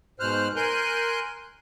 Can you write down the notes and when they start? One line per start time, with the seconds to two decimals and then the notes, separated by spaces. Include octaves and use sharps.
0.20 G#2 B2 C5 F6 F#6
0.56 A#4 G#5 C6 F#6 G6